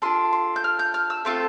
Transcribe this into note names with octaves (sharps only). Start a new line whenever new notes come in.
D4 F4 A4 C6
C6
G6
F6
G6
F6
E6
A3 C4 F4 A4 C6